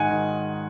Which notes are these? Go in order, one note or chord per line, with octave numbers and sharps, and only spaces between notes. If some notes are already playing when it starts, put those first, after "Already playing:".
Already playing: G#2 D#3 F#5 G#5
D#3